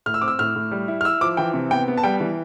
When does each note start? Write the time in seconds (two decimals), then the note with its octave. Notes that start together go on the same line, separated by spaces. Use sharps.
0.06 A2 F6
0.14 E6
0.21 C4 D6
0.28 E6
0.39 A2 F6
0.56 A2
0.71 G3
0.88 E4
1.01 F6
1.05 E4 E6
1.21 F3 D6
1.37 E3 G5
1.54 C3
1.71 B3 G5
1.88 B3
1.98 A5
2.03 G3 G5
2.20 E3